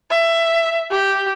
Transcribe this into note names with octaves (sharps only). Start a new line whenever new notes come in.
E5
G4